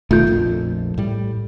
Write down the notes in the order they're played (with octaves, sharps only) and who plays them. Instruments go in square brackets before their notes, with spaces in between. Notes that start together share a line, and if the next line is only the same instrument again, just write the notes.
[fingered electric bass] F1 B2 D#3 [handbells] A3 F4 G6
[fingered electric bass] A#1 F2
A2 G3